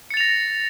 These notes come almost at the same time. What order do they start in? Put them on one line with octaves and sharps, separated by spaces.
C#7 A6 F7 A#6